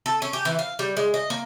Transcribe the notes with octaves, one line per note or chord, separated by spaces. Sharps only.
A4
C#4
G4
E3
F5
G3
G#3
D#5
A#3